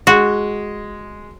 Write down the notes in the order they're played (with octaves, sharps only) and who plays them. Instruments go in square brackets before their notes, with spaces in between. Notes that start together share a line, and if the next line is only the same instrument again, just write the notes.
[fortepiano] G#3 [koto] F#4